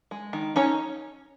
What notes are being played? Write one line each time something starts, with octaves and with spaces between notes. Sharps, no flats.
G#3
D#3
C#4 D#4 C#5